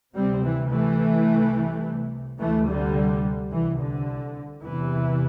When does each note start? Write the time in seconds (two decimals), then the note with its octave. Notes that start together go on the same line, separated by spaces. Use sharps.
0.14 D2 C3 G3 C4
0.43 E3
0.71 E3 A3
1.28 C2 C3
2.39 D2 C3 E3 A3
2.67 D3 G3
3.51 C2 C3 E3
3.80 D3
4.64 E2 C3 E3